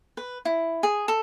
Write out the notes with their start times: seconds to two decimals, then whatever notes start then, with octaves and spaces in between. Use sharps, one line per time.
0.17 B4
0.45 E4
0.83 G#4
1.08 A4